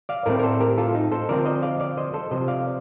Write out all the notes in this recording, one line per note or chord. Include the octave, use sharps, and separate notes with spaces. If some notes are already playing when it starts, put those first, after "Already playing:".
D5 F5
A2 A3 C4 A#4 D5
A#4
A4 C5
G4 A#4
F4 A4
D#4
A4 C5
D3 F3 C4 A#4 D5
C5 D#5
D5 F5
D5 F5
C5 D#5
A4 C5
C3 F3 C4 C5 D#5
D5 F5